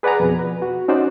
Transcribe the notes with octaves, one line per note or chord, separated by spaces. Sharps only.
G#4 B4 D5 F#5 G#5 A#5
F2 B2
B4
F#4
C#4 D#4 F#4 C5 D5